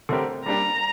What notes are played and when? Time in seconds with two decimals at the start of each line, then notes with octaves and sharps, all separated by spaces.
0.09 D3 A3 C4 G4 A#4
0.45 G3 A#3 D4 G4 A#5